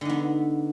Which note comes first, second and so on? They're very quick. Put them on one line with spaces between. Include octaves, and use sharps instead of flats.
D3 D#4 B3